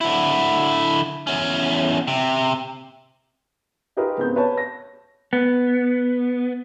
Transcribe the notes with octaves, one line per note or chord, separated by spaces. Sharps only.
D3 E4
E2 C#4
C3
D#4 F4 G4 G#4 A#4 B4
G#2 C#3 B3 C4 G6
B4 C#5 A5
A#6
B3